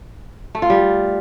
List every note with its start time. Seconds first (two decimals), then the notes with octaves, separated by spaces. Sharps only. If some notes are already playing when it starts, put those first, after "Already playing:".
0.55 A3
0.62 F4
0.70 G3